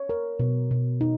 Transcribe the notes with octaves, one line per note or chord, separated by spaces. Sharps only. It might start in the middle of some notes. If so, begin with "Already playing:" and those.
Already playing: C#5
A#4
B2
B2
D#4